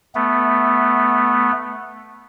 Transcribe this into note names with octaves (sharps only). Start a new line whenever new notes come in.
A3 B3